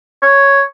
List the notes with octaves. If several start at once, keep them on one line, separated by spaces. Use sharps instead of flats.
C#5